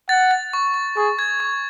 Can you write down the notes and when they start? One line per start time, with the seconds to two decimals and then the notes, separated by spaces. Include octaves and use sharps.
0.09 F#5 A6
0.31 A6
0.53 C#6
0.74 C#6
0.97 G#4 C#6
1.19 G#6
1.40 C#6